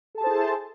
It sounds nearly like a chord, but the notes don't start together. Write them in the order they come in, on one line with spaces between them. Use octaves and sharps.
A4 A5 G#4 C5 E4